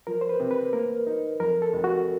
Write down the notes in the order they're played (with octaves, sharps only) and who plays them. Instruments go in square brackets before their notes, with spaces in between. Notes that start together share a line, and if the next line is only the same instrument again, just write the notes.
[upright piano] F3 [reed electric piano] A#4
[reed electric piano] C5
B4
[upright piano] C3
[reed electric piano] B4
[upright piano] A#3 [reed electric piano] A#4
[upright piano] D#4
[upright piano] F2 [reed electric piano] A#4
[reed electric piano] A4
[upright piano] F1
[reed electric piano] F#4